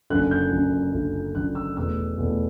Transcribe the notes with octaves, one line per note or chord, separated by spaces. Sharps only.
F#1 F#2 D3 F#6
G6
F#1 F#2 D3
F#1 F#2 D3
F#1 F#2 D3 F#6
E6
E2 B2 A3 E6
E2 B2 A3